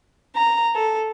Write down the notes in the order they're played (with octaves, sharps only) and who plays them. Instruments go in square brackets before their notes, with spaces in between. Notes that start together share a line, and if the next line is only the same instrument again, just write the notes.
[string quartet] A#5
A4